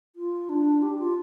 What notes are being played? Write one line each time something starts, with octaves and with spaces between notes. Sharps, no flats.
F4
D4
G4
F4